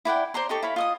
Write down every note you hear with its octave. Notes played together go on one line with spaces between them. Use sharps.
E4 D5 F#5 G5
C5 D5 A#5 C6
D#4 G4 A4 C#6
E4 C#5 F5 B5
F4 D#5 D#6